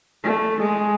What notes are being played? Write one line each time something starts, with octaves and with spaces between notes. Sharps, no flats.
A3
G#3